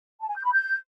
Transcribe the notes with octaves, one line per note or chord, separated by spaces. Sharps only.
A5
G#5
G6
B5
G6